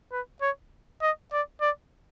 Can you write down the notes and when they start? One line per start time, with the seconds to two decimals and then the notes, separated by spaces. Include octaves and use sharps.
0.12 B4
0.42 C#5
1.02 D#5
1.32 D5
1.61 D5